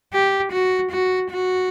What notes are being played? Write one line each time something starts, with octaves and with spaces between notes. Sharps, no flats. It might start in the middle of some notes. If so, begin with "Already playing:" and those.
G4
F#4
F#4
F#4